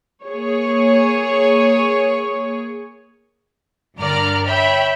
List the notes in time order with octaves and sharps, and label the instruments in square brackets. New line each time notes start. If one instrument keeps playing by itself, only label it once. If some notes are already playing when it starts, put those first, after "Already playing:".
[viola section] A#3 G#4 C#5
[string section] G2 D3 A#4 D5 A#5 F6
C#5 E5 G5 B5